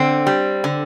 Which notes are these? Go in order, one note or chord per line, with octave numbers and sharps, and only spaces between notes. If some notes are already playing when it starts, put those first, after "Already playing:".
Already playing: D3 C4
G3
D3